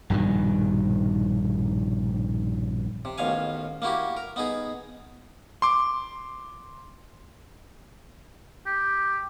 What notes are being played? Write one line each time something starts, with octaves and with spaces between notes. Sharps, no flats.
A#1 G2 B2 D#3
C3
A1 D#2 B2 F5 G#5
A#3 E4 F#4 G4
A#4
B3 D#4 G#4
C6 D6
G4